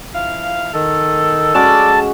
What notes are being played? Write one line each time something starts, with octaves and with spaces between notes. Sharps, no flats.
F3 E4 F5
D#3 A4
G#3 C#4 F#4 D5 A5